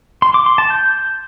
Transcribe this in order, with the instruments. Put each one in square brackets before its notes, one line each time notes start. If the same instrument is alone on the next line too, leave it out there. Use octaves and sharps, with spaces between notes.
[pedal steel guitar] C6
D6
C6
A5
G6